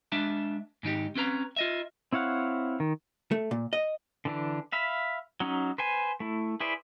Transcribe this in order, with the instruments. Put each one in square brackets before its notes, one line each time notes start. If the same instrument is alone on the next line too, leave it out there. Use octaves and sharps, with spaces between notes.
[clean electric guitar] G#3 D4 E5 A5
G#2 D#3 D#4 G4
C4 C#4 B4 A#5
F4 D#5 E5
[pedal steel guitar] C4 E4 C#5 F5 F#5
D#3
[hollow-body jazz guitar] A3
A#2
D#5
[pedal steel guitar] D3 E3 D4
E5 F5 B5
F#3 C#4 D#4
B4 C5 G#5
A3 E4
E4 G#4 B4 C5 D5